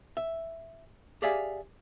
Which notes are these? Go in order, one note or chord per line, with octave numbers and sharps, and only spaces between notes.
E5
G4 G#4 D5 E5 F5 G#5